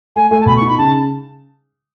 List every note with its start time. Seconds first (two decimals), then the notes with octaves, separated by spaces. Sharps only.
0.16 A3 G#5
0.31 A3 G#5
0.41 A5
0.46 B2 B5
0.57 C#6
0.62 D#4
0.68 B5
0.78 C#3 A5